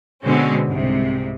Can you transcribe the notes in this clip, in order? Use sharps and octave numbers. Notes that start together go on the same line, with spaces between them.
B2 D3 G#3 C4 C#4
C2 G#2 C3